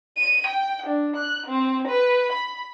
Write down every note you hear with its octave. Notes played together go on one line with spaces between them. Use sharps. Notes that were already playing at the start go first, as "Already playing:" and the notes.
D#7
G5
D4
F#6
C4
B4
B5